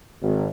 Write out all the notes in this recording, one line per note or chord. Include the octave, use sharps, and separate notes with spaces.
G#1